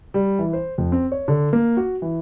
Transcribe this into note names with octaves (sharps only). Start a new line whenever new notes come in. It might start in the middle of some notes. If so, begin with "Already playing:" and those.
G3
E3
C5
F2
C4
C#5
D3
A#3
F#4
E3